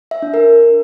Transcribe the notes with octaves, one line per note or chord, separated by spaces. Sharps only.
E5
D4
A#4